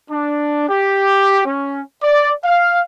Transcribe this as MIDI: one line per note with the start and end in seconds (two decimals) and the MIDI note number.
0.10 0.66 62
0.69 1.43 67
1.45 1.81 61
2.02 2.32 74
2.44 2.81 77